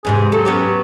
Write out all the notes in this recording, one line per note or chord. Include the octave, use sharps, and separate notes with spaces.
E2 G#2 C3 G#4
F#3 A4
B3 C#4 G4